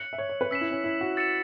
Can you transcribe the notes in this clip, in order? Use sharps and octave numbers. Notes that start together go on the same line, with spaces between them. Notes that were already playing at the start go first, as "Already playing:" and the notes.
Already playing: C#5 F#6 C#7 F#7
E5
C#5
C#5
B4
C#4 E6 B6 E7
E4
C#4
E4
F#4
E6 A6 C#7 E7